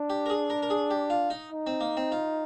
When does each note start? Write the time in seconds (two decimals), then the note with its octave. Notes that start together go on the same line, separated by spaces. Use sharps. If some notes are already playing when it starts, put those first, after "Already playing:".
Already playing: D4
0.10 G4
0.26 A#4
0.30 G#4
0.50 A#4
0.62 A#4
0.70 G#4
0.90 G4
1.10 F4
1.30 D#4
1.51 D#4
1.67 C4
1.80 A#3
1.97 C4
2.12 F4